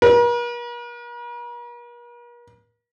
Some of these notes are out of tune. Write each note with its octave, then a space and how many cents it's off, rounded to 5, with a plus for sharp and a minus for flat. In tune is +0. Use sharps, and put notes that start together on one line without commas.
A#4 +45